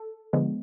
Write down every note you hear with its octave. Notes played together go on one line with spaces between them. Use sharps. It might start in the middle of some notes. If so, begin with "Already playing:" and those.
Already playing: A4
D3 F3 G#3 B3